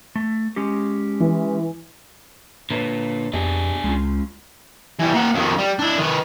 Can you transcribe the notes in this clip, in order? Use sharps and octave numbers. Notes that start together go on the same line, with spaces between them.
A3
G#3 C#4 G4
E3
A#2 D3 B4 C#5
F2 B3 D4 G4 G#4 D#5
C#2 G#3 C#4 F4
E3 G3
A#3 F#5
F2 D#3
G3
D4 E4
D#3 B4